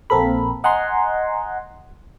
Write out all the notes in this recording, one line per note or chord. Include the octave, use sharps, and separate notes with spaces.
A#1 A#3 C4 A4 A#4 B5
D#5 F#5 G#5 A#5 C6